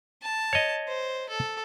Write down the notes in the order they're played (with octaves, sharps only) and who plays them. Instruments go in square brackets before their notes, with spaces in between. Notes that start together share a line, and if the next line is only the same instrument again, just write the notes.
[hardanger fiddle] A5
[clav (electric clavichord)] C#5 D#5
[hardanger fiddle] C5
A4